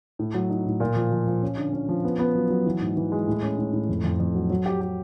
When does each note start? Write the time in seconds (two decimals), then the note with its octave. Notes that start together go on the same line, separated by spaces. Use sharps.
0.19 A2
0.34 F#3
0.50 D#4
0.66 A2
0.80 A#2
0.96 F3
1.11 F3
1.27 F3
1.42 C#4
1.57 D3
1.73 C#4
1.89 F3
2.04 B3
2.19 B3
2.35 F#3
2.50 F#3
2.66 E3
2.81 G#2
2.97 E3
3.12 G#3
3.27 A2
3.43 C#4
3.58 A2
3.73 A2
3.89 F2
4.04 F2
4.20 F2
4.35 F#3
4.50 F#3
4.66 G4
4.81 G4